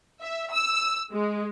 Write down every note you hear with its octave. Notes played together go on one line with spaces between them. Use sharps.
E5
E6
G#3